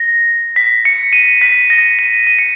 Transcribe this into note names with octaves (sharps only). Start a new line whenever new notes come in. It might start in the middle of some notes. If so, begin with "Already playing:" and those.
Already playing: A#6
B6
C#7
D#7
B6
A#6
D#7
D#7
C#7